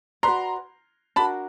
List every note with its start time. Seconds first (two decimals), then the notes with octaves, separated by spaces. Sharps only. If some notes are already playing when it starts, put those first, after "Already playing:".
0.23 F#4 B4 D5 A#5 C6
1.16 D4 F#4 A#4 A5 B5